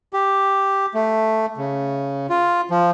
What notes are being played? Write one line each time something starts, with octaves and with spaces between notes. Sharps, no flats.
G4
A3
C#3
F4
F3